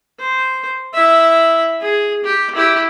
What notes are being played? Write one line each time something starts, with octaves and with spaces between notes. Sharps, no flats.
C5
E4 E5
G#4
G4
E4 G4